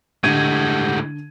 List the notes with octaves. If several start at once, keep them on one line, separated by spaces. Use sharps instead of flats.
A2 D3 G#3 G4 F#5 G6 G#6 D#7